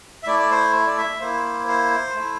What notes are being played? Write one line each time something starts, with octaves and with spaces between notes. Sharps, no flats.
E5
A3 E4 D5
D5
C5
D5
E5
A#3 E4 C5
C5
A3 E4